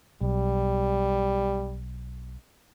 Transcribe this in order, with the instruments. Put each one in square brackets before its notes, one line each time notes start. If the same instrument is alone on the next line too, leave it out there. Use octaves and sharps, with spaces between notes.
[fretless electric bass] B1 [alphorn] G3